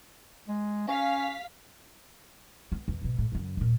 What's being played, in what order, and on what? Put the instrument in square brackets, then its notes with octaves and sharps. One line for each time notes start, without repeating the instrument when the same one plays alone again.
[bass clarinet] G#3
[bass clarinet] C#4 [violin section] F5 B6
[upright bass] B3
E2
G#1 B2
A2
F#2 C#3
D#1 A#2